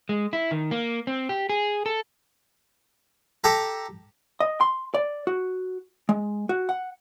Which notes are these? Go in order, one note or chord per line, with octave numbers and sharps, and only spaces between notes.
G#3
E4
D#3
A#3
C4
G4
G#4
A4
G4 A4 A#5
D#5
C6
D5
F#4
G#3
F#4
F#5